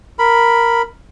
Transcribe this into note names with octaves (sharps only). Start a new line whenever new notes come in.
A#4 B5